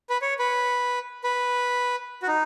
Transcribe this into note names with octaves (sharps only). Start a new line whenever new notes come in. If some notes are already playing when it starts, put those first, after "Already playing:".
B4
C#5
B4
B4
F#4
D#4